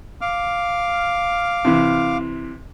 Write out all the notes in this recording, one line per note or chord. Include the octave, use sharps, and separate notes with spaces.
F5 D6 F6
C3 E3